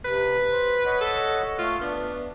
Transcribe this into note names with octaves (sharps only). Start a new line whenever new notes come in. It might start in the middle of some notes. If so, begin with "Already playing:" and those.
C3 B4
C5
C#5 D#5 F#5
A4
A3 F4
B3 D4